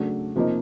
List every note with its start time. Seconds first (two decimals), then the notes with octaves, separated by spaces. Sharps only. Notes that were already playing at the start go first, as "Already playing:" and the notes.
Already playing: C#3 F#3 A3 D4
0.36 C3 F3 A#3 D#4